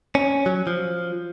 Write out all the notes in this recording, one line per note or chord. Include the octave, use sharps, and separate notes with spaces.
C#4
F#3
F3